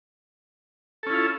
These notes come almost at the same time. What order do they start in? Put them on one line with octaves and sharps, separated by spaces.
A4 C#4 E4 F4